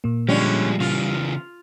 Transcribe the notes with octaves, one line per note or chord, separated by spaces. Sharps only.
A#2 A#3
D3 F3 G3 G#3 C#4
C#3 E3 F4